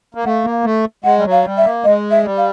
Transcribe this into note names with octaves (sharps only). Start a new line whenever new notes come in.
A#3
A3 F5 F#5
A#3
A3
G#3 F#5
G3
F#3
F5
G3
E5
A#3
G#3 D#5
E5
G3
F5